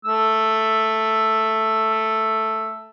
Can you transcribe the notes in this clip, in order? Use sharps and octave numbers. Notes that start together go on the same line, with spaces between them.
A3 E6